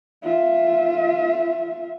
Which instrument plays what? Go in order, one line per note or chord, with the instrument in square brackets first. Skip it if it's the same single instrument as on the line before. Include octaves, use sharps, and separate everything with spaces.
[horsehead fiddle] F4 E5